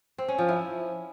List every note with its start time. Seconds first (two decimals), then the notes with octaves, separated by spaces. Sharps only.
0.18 C4
0.28 C#4
0.38 F3
0.48 E4